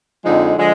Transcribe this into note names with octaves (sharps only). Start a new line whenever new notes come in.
F2 D3 F3 G#3 D#4
D3 F3 G#3